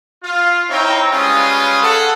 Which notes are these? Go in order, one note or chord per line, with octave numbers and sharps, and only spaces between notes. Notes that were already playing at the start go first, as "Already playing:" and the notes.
F4 F5
C4 D#4 E4 C#5 G5 A#5
G3 G#3 C#4 F4 B4 D#6
G#4 A4 F#5